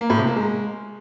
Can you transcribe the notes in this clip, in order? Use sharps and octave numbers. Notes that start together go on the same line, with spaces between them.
A#3
A2
C3
A#3
G#3